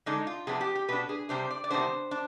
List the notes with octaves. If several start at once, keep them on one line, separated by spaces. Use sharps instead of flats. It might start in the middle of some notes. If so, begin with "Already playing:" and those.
D3 G#3 D4 D#4
F4
C3 F3 B3 D4 G#4
G4
G4
B2 B3 D4 B4
G#4
C3 G3 D4 C5
D5
D5
C3 D#3 G3 B3 D4 C5
D4